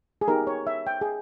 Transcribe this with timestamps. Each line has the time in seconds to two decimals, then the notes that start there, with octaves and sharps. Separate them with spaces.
0.21 G#4
0.28 B3 D#4 G4 A#4
0.47 C#5
0.67 E5
0.87 G5
1.01 G#4